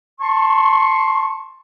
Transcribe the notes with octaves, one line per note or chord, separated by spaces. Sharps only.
A5 C6 C#6